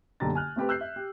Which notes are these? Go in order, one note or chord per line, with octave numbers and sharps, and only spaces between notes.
F#1 B1 D3 G4 A#5 A6
G#5 F6 F#6
A3 C4 G4 B4
E6 F#6 G6 C7
E5
G4